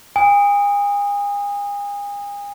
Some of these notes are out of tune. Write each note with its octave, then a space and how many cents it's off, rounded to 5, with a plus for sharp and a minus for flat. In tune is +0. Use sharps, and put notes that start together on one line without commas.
G#5 -40 D#6 +0